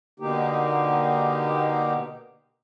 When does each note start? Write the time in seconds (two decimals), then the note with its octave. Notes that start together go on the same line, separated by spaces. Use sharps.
0.20 B2 D3 A#3 D#4 G4